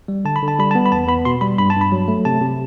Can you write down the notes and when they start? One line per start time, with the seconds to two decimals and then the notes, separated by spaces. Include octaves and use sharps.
0.08 G3
0.25 D3 A5
0.36 B5
0.42 D3
0.48 A5
0.59 G3 B5
0.71 A5
0.75 B3
0.86 B5
0.92 E2 A5
1.08 B3 B5
1.25 B2 C6
1.41 G3 B5
1.58 G2 B5
1.70 A5
1.76 G2
1.81 B5
1.92 F#3
2.08 A3
2.25 C3 A5
2.41 C3